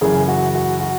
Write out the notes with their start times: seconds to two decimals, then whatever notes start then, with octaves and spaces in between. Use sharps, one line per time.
0.01 F#2 C#3 E3 G#4
0.28 F#4
0.55 F#4
0.80 F#4